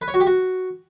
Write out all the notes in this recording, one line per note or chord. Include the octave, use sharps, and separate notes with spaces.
B4
C#5
F#4
G4
F#4